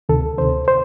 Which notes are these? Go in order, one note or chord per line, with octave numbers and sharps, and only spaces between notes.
D2 C3 D#3 A4
D2 C3 D#3 C5
C5